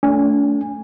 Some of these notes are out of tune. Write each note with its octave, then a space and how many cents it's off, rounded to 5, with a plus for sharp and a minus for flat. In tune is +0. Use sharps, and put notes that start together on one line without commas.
A3 +0 D4 -45 G#5 -20